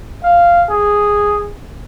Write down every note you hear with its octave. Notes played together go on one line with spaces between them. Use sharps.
F5
G#4